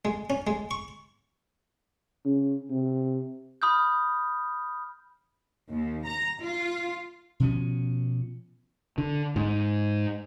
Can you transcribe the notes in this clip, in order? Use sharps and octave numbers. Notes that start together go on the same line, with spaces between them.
G#3
C#4
G#3
C#6
C#3
C3
B5 D#6 F6 G6
D#2
A#5
F4
B2 F3 C#4
D3
G#2